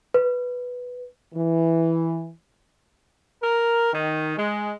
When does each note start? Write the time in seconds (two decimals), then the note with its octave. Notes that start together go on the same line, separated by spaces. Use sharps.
0.14 B4
1.34 E3
3.42 A#4
3.93 D#3
4.37 G#3